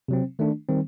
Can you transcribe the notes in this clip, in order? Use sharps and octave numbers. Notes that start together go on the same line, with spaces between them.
C3 F#3 C4
D#3 A3 D4
D#3 G3 C4